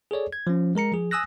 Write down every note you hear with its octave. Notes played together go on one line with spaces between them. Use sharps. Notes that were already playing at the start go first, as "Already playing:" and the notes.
G#4 A4 C#5 D5
G#6
F3 C#4
G#3 A#4 A#5 C#7
F3 G#4
G#5 D#6 E6 F#6 A#6